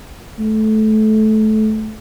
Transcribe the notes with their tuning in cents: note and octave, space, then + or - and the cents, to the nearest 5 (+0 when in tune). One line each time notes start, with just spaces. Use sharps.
A3 -20